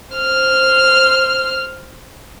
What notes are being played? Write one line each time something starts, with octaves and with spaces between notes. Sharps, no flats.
C5 F6